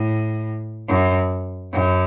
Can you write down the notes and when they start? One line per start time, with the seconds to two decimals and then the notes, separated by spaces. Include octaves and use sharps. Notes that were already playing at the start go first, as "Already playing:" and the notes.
Already playing: A2
0.88 F#2
1.73 F#2